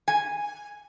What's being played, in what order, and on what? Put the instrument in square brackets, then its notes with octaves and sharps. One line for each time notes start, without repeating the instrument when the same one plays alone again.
[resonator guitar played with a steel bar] G#5